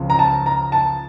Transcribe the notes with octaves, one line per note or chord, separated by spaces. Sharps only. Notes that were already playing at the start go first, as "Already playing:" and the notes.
Already playing: C#2 C#3 F3
A#5
A5
A#5
A5